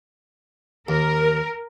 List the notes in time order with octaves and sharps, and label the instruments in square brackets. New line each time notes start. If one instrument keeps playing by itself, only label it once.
[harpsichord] D#2 [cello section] A#4